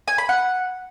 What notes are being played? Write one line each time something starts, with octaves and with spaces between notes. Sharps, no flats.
G#5
B5
F#5